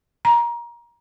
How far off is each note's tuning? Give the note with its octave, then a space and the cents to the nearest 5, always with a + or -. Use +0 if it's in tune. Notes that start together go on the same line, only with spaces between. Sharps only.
A#5 +25